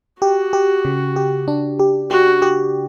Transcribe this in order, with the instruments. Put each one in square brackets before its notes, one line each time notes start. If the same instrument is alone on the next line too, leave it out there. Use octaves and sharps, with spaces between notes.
[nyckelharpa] F#4 [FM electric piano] G4
[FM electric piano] G4
C#3
G4
D4
G4
[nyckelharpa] F#4 [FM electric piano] G4
[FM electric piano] G4